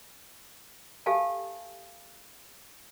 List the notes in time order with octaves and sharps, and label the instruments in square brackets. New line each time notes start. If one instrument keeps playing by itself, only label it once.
[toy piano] G4 A4 E5 F5 G#5 A5